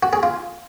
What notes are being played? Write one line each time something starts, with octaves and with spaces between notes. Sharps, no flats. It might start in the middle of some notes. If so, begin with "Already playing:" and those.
F#4
G#4
F4